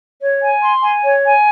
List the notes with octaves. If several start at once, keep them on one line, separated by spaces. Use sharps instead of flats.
C#5
G#5
C6
G#5
C#5
G#5